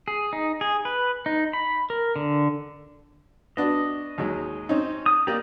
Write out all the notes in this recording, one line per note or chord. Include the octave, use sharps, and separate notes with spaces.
G#4
D#4
G#4
B4
D#4
B5
A#4
D3
B3 D4 F#4 D#5
D#2 F#3 G#3
C4 C#4 D#4
D#6
A#3 D#4 G4 D5 D#5